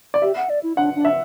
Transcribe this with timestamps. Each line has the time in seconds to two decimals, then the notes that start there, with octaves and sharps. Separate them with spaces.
0.14 D5
0.22 G4 E5
0.37 F#5
0.50 D5
0.63 E4
0.77 D4 F#5
0.96 D4
1.05 E5